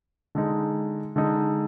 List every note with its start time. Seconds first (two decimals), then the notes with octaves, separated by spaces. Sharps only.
0.35 D3 G#3 D#4
1.16 D3 G#3 D#4